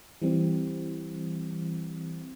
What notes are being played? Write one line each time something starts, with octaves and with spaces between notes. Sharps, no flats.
E3 G3 C4